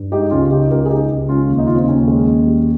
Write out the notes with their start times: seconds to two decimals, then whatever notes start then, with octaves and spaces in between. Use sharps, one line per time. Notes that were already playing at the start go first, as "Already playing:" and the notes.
Already playing: G2
0.12 G#3 D#4 G4
0.31 C#2 C#4 F4
0.51 C#3 D#4 G4
0.71 C#2 G4 A#4
0.85 G#4
0.90 G#3 D#4 G4
1.10 C#2
1.29 G#3 C#4 F4
1.49 D#2
1.58 D#4
1.67 C#3 F4
1.74 C4 D#4
1.88 D#2 C#4
2.08 G#3
2.27 D#2
2.47 G3